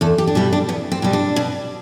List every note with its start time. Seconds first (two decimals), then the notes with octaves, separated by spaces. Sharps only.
0.01 E2 A4
0.18 G4
0.27 D4
0.35 B2 G3 E4
0.53 D4
0.69 E2 B3
0.92 C4
1.02 B2 G3
1.13 D4
1.36 B2